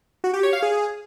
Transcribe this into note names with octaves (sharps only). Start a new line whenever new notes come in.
F#4
G4
C#5
F5
G#4